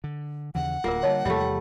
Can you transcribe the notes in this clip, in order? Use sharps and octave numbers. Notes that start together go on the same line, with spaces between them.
D3
D#2 C#3 E3 F#5
D1 D2 A#3 F4 A#4
D3 G3 C#5 D#5 A5
E2 C3 F3 G3 A3 E5